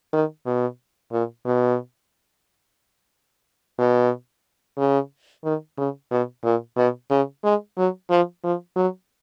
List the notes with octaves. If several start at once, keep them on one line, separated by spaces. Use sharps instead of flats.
D#3
B2
A#2
B2
B2
C#3
D#3
C#3
B2
A#2
B2
C#3
G#3
F#3
F3
F3
F#3